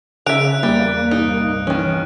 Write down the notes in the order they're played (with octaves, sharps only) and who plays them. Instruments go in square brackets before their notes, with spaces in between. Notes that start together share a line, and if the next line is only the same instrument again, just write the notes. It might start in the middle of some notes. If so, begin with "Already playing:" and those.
[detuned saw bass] C#3 [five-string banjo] E5 A#5 [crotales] F#6 D7
[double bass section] E2 [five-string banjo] G3 [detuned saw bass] A#3
[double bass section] C2 G2 G3 [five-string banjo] D#4
[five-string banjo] D#3 C#4 [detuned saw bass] E3